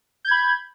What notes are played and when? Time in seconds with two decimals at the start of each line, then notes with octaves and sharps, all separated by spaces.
0.25 G6
0.28 G#6
0.31 B5